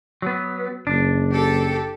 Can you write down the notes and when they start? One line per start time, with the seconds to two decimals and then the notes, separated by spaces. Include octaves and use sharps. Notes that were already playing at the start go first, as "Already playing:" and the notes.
0.22 F#3 B3
0.87 F#1 D4
1.31 G4 A4